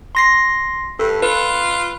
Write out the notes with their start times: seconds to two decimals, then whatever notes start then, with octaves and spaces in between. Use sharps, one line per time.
0.15 C6 A#6 C7
0.99 G2 A4
1.22 F4 B4